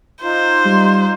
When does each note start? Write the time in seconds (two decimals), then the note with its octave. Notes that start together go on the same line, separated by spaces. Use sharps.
0.23 D#4 F4 C5
0.65 G3